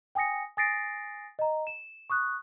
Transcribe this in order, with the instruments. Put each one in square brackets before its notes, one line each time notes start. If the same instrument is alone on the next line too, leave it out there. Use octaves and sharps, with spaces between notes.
[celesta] G5 G#5 D#6 A#6 C#7
G#5 D#6 A6 A#6 C7 D7
D#5 A#5
E7
C#6 D#6 F#6